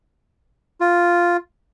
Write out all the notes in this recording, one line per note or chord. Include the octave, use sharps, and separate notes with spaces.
F4